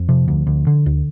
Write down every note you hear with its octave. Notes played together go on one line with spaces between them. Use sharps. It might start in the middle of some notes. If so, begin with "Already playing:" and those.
Already playing: F2
C3 F3
D2
D2
D3
D2